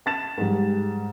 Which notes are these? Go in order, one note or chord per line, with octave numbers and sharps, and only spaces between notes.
A5 A6 E7
G#2 G3